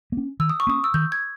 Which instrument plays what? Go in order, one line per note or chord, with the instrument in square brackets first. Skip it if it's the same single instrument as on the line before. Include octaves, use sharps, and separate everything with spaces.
[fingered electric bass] A#3 C#4
[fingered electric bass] D#3 [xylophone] E6
[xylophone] D#6
C#6
[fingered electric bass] A#3 C#4 [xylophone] D#6
[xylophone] E6
[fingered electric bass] D#3 [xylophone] G6
[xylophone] G#6